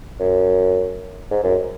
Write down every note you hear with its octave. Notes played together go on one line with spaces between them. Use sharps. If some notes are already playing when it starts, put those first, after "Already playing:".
F#2
G#2
F#2